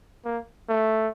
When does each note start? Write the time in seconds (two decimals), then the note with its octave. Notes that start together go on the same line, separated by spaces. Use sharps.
0.25 A#3
0.69 A3